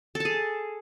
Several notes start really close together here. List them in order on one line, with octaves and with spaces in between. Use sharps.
A4 A5 G#4